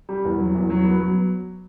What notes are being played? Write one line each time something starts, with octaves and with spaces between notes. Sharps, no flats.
G3
E2
F#3
E2
F#3
B3
F#3